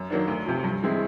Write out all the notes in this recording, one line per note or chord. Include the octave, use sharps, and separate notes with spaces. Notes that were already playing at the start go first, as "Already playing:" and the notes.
Already playing: F#2
D#3 F#3 A#3 D4
D2
C3 F3
G2
E3 G#3 C4 E4